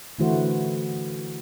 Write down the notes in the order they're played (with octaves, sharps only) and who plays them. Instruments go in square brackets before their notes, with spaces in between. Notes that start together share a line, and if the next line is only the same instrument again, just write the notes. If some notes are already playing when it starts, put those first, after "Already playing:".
[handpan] D3 E3 A3 E4 F#4 C5